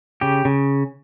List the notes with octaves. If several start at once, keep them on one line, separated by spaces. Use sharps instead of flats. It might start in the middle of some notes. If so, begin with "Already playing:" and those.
C#3 G4
C#3